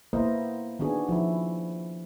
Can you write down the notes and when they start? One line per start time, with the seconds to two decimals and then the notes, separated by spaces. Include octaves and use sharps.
0.13 A#3 B3 E4 A#4 C5 D#5
0.79 D#3 B3 D4 F#4 G#4
1.09 F3 E4